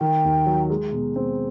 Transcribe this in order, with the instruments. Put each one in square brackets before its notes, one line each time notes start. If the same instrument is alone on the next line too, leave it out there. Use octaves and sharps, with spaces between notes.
[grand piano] D#3 [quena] G5
[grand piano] D#2
F#3
G#3
B2
C4